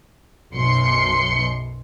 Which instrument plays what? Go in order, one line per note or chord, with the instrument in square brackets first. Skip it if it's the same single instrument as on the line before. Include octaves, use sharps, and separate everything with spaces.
[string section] B1 F#2 C6 C#7